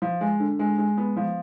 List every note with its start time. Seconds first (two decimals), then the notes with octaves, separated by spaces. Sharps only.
0.02 F3
0.21 G#3
0.40 D3
0.59 G#3
0.78 G#3
0.97 B3
1.17 F3